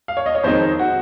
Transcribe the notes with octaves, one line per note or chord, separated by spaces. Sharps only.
F5
C#5
D#5
C#5
F2 D#3 G#3 C4 D#4 C5
F#4